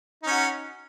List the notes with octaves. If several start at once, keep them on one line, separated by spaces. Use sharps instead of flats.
C#4 D#4 F#4